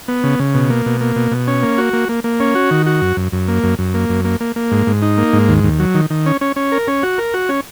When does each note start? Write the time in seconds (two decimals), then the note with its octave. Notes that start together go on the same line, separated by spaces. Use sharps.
0.08 B3
0.23 C#3
0.39 C#3
0.54 B2
0.70 A#3
0.86 B2
1.01 A#3
1.16 B2
1.31 B2
1.47 C#4
1.63 A#3
1.78 F#4
1.93 A#3
2.09 A#3
2.24 A#3
2.40 C#4
2.55 F#4
2.71 D#3
2.86 F#4
3.01 F#2
3.17 F#2
3.32 F#2
3.48 A#3
3.63 F#2
3.79 F#2
3.94 A#3
4.09 F#2
4.25 A#3
4.40 A#3
4.56 A#3
4.71 G#2
4.87 G#2
5.02 D#4
5.18 A#3
5.33 G#2
5.49 D#2
5.64 D#2
5.79 F#3
5.95 D#3
6.10 D#3
6.26 C#4
6.41 C#4
6.56 C#4
6.72 A#4
6.87 C#4
7.03 F#4
7.18 A#4
7.34 F#4
7.49 C#4